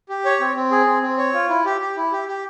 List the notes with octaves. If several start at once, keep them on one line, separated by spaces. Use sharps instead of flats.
G4
C#5
C4
C4
G#4
C4
C4
C#5
F4
E4
G4
G4
E4
G4
G4